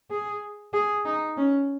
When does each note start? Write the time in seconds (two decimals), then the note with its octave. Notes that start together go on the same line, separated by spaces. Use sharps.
0.11 G#4
0.73 G#4
1.05 D#4
1.37 C#4